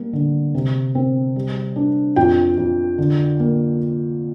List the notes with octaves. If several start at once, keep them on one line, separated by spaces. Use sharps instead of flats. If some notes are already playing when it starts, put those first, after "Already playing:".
Already playing: G3 A#3
D3
C3
C4
G3
D4
F2 G5
F2
D3
A#3